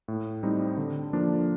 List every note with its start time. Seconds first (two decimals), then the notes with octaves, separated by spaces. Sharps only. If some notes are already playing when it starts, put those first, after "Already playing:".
0.08 A2
0.43 G3 C4 D#4
0.77 D3
1.13 F3 A#3 D4